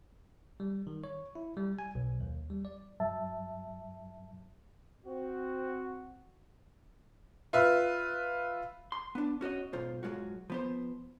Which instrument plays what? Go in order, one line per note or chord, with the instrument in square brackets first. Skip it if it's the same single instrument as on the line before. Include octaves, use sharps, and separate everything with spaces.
[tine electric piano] G3
D#3
C#5
E4
G3
G#5
B1
D#2
G3
D5
[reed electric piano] G2 F#3 E5 A5
[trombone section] C4 F#4
[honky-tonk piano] F4 B4 E5
[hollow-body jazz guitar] C6
B3 D4
C#4 F#4 C#5 D#5
B1 G#2 F4 C5
G#2 F#3 G#3 F4 F#4
F3 B3 C5